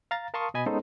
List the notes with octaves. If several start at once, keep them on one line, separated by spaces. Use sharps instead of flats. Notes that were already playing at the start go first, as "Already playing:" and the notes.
F5 A#5 A6
A#4 F5 A5 C6 C#6 D#6
B2 D#5 G#5 B5
G#3 B3 C#4 D#4 A4 C5